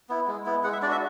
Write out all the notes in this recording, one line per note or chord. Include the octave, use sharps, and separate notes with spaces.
B3 E4
G#3
B3 E4
G#3 F#5
E5
D4 F#4 D5 E5